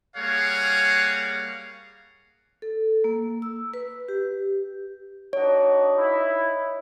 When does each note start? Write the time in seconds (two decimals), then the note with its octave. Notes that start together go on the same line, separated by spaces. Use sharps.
0.17 G3 A#3 G#4 C#5 F5 F#5
2.62 A4
3.04 A#3
3.42 E6
3.74 B4
4.08 G4
5.33 D4 D#4 F#4 C#5
5.95 D#4 E4